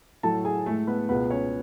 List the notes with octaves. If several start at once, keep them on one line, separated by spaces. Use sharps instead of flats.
A2 F#3 A3 A4 A5
G#4 G#5
A2 G#3 A3 A4
B3 B4
C#2 B2 G#3 B3 B4
C#4 C#5